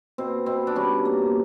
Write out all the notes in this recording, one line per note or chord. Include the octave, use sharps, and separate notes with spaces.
B2 C4
B2 C4
D4
G3 C#4
A#3